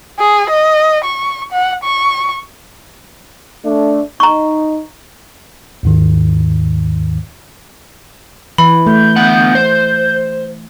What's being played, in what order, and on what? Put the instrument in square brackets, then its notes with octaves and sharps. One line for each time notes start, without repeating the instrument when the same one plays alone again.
[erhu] G#4
D#5
C#6
F#5
C#6
[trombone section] A3 D4
[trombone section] D#4 [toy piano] A#5 C#6
[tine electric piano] D#2 G#2 D#3
[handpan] E3 [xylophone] B5
[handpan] A3 [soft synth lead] G6
[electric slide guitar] D3 B3 F#5
C5